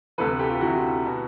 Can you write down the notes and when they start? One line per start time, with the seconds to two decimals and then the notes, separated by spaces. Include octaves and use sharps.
0.18 D2 C3 E3 A4 B4
0.39 G4 A4
0.50 F4 G4
0.61 D2 C3 E3 E4 F#4
1.05 B2